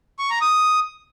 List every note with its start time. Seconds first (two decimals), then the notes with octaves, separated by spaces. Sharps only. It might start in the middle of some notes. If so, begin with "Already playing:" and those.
0.19 C#6
0.30 A#5
0.41 D#6